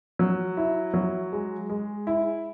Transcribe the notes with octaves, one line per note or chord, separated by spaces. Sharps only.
F#3
E4
F#3
G#3
G#3
E4